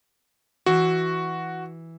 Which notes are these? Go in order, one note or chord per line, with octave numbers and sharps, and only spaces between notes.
E3 F#4